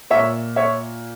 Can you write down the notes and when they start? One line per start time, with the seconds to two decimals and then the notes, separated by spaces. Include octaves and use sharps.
0.10 A#2 C#5 E5
0.56 C#5 E5